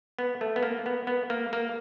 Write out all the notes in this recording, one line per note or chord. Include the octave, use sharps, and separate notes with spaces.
B3
A3
B3
A#3
B3
B3
A#3
A#3